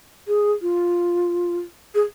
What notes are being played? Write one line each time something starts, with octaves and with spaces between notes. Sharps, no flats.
G#4
F4
G#4